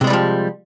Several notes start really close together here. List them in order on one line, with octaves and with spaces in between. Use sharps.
C3 G#3 G3 E3 F3